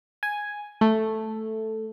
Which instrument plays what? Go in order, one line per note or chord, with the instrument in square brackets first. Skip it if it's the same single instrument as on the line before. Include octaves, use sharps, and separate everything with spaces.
[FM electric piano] G#5
A3